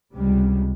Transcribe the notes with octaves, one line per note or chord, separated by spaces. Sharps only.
C#2 C3 G3